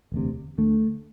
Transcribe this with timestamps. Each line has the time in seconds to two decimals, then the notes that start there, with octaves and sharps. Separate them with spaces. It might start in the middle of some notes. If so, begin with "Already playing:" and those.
0.12 E1 D2 C3
0.58 D2 D3 A3